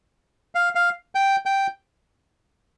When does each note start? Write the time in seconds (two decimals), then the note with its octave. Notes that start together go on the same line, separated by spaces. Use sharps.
0.55 F5
0.75 F5
1.15 G5
1.46 G5